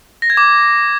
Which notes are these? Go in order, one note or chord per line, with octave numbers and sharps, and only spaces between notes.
A#6
G#6
D6